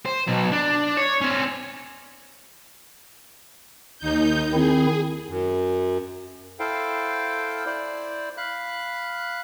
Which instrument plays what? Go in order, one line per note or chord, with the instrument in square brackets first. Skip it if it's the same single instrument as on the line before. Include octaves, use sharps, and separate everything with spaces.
[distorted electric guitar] C5
B2 F#3
D4
C#5
C4 C#4
[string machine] D#2 D#4 G6
[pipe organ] D#3 C4 E4 [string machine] G#4
[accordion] F#2
[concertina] E4 A4 C5 F5 G5
E4 C5 D5
F5 B5 F#6